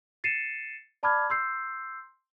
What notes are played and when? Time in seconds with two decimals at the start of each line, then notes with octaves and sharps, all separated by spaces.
0.24 A6 C7 C#7 D#7 E7
1.03 D5 A5 B5 D6 F6 G#6
1.30 C6 E6 G6 C7